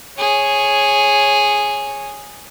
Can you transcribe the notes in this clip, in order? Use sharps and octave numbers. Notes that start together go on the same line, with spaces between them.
G#4 C#5